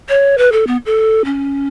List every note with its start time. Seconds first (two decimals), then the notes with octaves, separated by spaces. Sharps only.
0.09 C#5
0.38 B4
0.52 A4
0.67 B3
0.86 A4
1.25 C#4